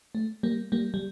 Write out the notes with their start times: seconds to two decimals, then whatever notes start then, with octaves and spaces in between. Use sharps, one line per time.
0.15 A3
0.43 G3 A#3
0.72 G3 A#3
0.94 G3